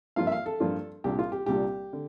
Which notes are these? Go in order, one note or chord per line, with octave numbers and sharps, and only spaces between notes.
G2 F3 A#3 D4 F4 F5
E5
F5
A4
G2 F3 A#3 D4 F4
C2 A#2 G3 D4 G4
F4
G4
C2 A#2 G3 D4 G4
D3